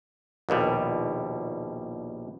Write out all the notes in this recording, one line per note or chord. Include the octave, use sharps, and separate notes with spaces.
A#1 D#2 B2 G3